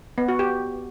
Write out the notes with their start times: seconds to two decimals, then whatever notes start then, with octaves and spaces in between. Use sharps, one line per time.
0.18 B3
0.28 F#4
0.39 G4